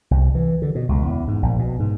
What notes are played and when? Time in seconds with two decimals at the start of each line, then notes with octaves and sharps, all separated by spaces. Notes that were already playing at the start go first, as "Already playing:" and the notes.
0.11 C2
0.35 E3
0.62 D3
0.75 B2
0.89 C#2
1.06 E2
1.28 G#2
1.42 A#1
1.59 B2
1.80 G#2